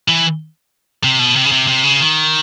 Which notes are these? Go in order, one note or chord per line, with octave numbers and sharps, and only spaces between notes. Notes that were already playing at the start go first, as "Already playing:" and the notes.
E3
C3
B2
C3
C#3
C3
C3
C#3
D#3